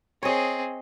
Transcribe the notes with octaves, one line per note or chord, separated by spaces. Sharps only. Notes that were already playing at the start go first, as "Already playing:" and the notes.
C4 G#4 C#5 D#5